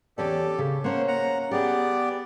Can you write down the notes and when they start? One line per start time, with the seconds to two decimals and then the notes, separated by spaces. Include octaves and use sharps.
0.18 E2 C#4 G4 A4 D5
0.58 C#3
0.84 A#3 C#4 C5 F#5
1.08 F#5 A#5
1.51 B3 G4 G#4 D5